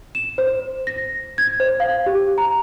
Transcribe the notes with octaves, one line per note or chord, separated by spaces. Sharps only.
E7
C5
A#6
G#6
C5
F5
G4
A#5